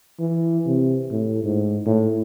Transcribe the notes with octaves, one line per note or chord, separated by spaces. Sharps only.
E3
C3
A2
G#2
A2